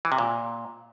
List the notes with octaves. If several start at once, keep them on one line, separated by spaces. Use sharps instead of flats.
E3
C3
A#2